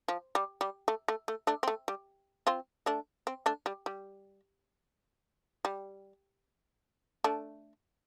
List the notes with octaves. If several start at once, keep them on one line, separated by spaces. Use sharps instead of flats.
F3
G3
G3
A3
A3
A3
A3 D4
C4
A3
G3
C4 F4
A3 D4
C4
A3 D4
G3
G3
G3
A3 D4